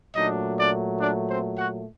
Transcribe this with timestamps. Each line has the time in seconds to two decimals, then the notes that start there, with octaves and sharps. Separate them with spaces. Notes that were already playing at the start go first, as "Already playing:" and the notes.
0.15 A#2 F#3 A3 D4 D#4 D#5
0.58 D4 D5
1.01 D4 D5
1.30 C4 C5
1.58 F#4 F#5